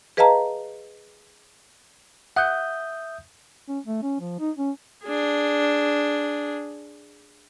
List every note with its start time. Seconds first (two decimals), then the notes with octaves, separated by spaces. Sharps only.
0.17 G#4 B4 D#5 F5 A5 A#5
2.36 E5 F#5 D#6 G6
3.68 C#4
3.86 A3
4.02 C#4
4.20 F3
4.40 D#4
4.58 C#4
5.04 D4 G#4